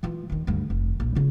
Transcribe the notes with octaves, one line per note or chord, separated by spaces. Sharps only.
E3 F4
D#2 D#3
D2 G2
F1
A#1
C#3 F4